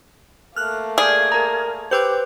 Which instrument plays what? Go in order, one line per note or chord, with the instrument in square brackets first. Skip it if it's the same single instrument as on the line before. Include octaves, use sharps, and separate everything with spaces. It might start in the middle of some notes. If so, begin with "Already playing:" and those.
[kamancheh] A3 A#3 [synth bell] F6 F#6
[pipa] G#4 [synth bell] D5 F6 G6
[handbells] A#4 A#5
[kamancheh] G4 [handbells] B4 C5 [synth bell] D6 E6 G6